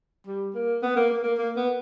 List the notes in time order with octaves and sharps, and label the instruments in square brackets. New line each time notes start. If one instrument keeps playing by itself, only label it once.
[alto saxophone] G3
A#3
B3
A#3
A#3
A#3
A#3
B3